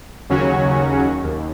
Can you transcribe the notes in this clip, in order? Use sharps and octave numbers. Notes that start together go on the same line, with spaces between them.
D#2 C#3 F#3 C#4 F#4
D#2